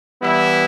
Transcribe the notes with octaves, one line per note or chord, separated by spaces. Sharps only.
E3 G3 B3 E4